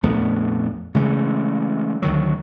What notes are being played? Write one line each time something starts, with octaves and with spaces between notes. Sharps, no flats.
A#1 F2 A3 B3
C#3 E3 G#3 A3
D2 D#3 F#3